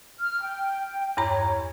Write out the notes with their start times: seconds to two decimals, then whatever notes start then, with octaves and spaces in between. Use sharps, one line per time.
0.20 F6
0.41 G5
1.17 E2 G2 C#5 A#5